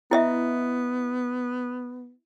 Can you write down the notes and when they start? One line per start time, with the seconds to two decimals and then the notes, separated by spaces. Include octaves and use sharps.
0.11 B3 E4 D#5 E5